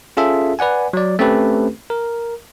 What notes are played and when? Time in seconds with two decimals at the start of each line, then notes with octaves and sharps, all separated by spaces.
0.17 C#4 F4 G#4 A4 E5
0.59 B4 D5 F#5 G#5
0.93 F#3 D5
1.19 A3 C4 C#4 G4 A4 B4
1.90 A#4